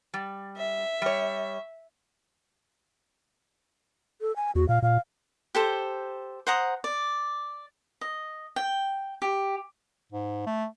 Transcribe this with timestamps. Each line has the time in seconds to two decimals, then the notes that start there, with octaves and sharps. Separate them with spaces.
0.14 G3
0.57 E5
1.02 G3 C#5
4.21 A4
4.36 G#5
4.55 E2 F#4
4.69 A#2 F5
4.82 A#2 F5
5.55 G4 A4 C5
6.47 C5 F#5 A#5 D#6
6.84 D5
8.01 D#5
8.56 G5
9.22 G4
10.12 G#2
10.47 A3